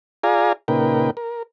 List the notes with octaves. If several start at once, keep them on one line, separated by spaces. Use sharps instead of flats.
F4 G#4 D5 F5 G#5 A#5
A#2 C#3 D#4 A#4 B4 G5
A#4